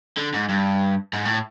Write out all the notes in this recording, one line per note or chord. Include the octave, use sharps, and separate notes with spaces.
D3
G#2
G2
G#2
A2